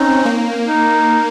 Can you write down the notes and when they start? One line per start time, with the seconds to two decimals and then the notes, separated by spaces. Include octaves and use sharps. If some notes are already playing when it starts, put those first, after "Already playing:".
Already playing: C4 C#4 D#4
0.25 A#3
0.67 D#4